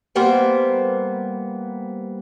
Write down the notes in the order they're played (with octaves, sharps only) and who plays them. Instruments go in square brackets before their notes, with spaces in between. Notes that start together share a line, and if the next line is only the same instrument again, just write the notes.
[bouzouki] G3 A#3 B3 C5